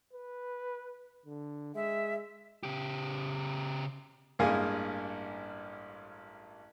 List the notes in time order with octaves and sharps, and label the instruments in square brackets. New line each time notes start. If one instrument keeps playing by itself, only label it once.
[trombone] B4
D3
[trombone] G#3 [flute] E5
[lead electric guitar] C#3 G4
[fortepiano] A1 G2 G#3 A#3 F5 G#5